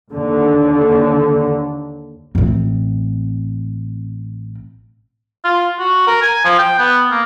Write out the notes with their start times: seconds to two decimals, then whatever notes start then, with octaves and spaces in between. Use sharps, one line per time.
0.11 D#2 D3
2.35 A1 C4
5.44 F4
5.79 F#4
6.07 A#4
6.22 G#5
6.45 F3
6.59 G5
6.79 B3
7.11 A#3